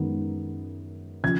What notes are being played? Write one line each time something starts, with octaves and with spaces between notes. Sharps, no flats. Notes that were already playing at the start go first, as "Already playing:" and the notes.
Already playing: F#2 D#3 G#3 B3 D#4
C#3 F3 G#6